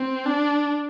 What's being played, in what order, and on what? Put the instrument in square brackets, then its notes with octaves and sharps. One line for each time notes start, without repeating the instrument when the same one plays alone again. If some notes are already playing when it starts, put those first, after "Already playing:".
Already playing: [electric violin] C4
D4